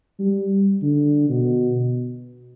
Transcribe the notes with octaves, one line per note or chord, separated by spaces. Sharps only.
G3
D3
B2